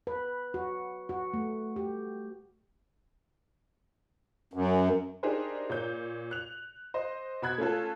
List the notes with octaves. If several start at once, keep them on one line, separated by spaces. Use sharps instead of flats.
B4
F#4
F#4
A3
G4
F#2
D4 D#4 G4 G#4 A#4 C5
A#2 C#5 G6
F#6 F7
C5 D#5
B2 F#4 B5 F#6 G#6
A3 C#4 F4 A4